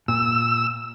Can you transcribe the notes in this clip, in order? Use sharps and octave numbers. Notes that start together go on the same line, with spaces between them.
A#2 E6